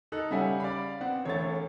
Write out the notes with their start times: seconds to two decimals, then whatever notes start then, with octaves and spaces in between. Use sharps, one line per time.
0.12 D#4 A4 F#6
0.31 C#3 G3 C#4 E5 F#5 G#5
0.60 D5 F5 B5
1.01 B3 C4 F#5
1.25 E1 A3 C#5 A6